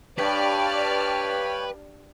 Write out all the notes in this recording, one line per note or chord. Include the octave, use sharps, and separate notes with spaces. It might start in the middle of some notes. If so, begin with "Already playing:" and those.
G2 B4 C#5 D5 G5 A5 F6